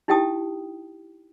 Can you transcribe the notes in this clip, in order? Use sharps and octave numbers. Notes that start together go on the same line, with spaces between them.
D#4 E4 G4 G5 A5 D#6